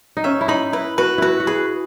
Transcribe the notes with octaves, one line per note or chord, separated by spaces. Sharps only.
D#4
C#4 E5
E4
D#4 B5
E4 B4
F#4 B4
E4 F#4 B4
F#4
G#4 B5